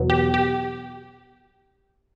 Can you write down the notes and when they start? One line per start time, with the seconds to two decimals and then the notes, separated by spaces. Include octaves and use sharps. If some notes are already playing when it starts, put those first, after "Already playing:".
Already playing: E2 B2 F#3
0.10 G4
0.34 G4